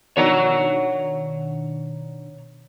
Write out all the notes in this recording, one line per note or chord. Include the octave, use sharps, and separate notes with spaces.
B2 D#3 D4 C#5 F#5 A#5